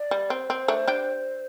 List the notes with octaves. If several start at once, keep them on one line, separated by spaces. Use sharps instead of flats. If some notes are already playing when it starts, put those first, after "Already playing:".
Already playing: D5
G3
C4 C5
C4
A3 D4
D4 G4